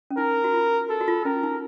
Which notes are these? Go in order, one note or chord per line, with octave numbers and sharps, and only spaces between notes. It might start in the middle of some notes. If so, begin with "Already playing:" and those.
C#4
D#4 A#4
F#4
F4
F#4 A4
F#4
F4
C#4 A#4
D#4